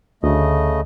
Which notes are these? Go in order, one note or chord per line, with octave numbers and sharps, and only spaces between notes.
D2 C#3 A3 D#5